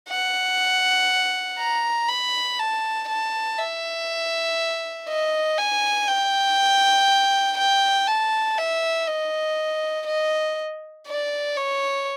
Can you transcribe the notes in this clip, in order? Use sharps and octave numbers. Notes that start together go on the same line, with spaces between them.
F#5
A#5
B5
A5
A5
E5
D#5
G#5
G5
G5
A5
E5
D#5
D#5
D5
C#5